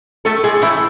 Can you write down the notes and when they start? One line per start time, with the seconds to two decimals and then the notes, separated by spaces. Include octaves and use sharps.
0.25 A2 A3 A4
0.44 A2 G#3 G#4
0.62 A2 E3 E4